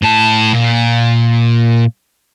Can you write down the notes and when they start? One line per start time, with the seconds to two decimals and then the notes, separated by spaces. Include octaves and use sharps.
0.03 A2 A5
0.53 A#2